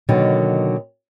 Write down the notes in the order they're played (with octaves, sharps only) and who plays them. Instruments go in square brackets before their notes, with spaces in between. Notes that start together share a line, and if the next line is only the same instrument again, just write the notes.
[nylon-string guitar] B2 D3 D#3 F#3 A#3 B3